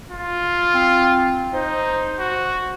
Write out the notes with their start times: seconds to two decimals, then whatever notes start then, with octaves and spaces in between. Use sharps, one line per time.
0.11 F4
0.74 C4
1.54 D#4 C5
2.19 F#4